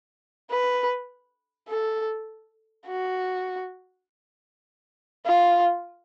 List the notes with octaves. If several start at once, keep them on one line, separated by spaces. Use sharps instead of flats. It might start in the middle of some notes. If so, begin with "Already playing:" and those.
B4
A4
F#4
F4